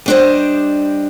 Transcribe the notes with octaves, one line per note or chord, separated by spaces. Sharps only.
G3 D4 G4 C5 D#5